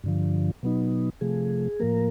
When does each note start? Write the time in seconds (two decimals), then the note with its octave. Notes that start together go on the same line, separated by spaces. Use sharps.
0.04 G2 D3 F3
0.63 B2 F#3 B3 D#4
1.21 C3 F3 A3 G#4
1.80 A2 F3 A#3 A#4